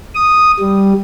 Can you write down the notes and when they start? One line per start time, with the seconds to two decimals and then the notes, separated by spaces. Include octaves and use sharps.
0.15 D#6
0.60 G3